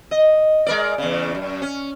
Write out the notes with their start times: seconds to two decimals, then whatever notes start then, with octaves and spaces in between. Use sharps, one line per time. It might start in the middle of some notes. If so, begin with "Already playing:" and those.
0.11 D#5
0.66 G#3 A#4 D5
0.98 E2 C#3
1.35 F#2
1.62 C#4